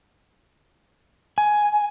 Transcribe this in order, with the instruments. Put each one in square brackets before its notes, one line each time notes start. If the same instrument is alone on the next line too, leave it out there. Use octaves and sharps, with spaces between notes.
[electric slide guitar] G#5